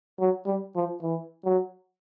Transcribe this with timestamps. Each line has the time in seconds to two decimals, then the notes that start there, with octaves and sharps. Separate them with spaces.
0.20 F#3
0.46 G3
0.76 F3
1.02 E3
1.44 F#3